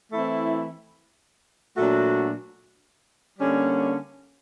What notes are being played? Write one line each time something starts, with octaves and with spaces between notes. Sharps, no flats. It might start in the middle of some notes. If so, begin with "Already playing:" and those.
E3 A3 C4 E4
A#2 F#3 A3 D4 F#4
D3 G3 A#3 C#4